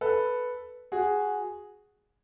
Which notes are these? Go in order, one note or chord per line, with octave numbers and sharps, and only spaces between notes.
A4 B4
F#4 G#4